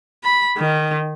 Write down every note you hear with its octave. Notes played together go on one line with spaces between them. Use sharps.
B5
D#3